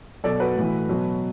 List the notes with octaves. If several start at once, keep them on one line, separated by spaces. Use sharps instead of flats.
B2 F#3 A4 D5
F#4 B4
A2 E3
B2 F#3